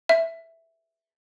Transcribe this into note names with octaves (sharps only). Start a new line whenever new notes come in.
E5